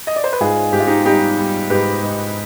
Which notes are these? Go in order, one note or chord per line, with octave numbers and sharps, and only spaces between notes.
D#5
D5
C5
B4
G#2 F4 G#4
G#2 G4
F4
D#4 G4
G3 D#4 G4
G3
G#2 G4 B4
G#2